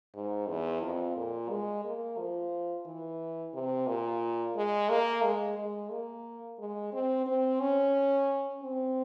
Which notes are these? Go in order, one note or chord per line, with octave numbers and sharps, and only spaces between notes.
G#2
E2
F2
A#2
G#3
A#3
F3
E3
C3
A#2
G#3
A#3
G#3
G#3
A#3
G#3
C4
C4
C#4
C4